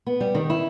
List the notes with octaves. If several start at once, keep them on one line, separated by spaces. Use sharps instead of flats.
B3
G3
D#3
E4